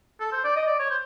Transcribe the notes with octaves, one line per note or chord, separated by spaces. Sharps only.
A4
C5
D5
D#5
D5
C#5
C5